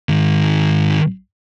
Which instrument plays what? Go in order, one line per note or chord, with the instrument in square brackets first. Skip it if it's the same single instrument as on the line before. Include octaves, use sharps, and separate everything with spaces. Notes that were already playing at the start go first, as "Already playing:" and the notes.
[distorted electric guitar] G#2 D#3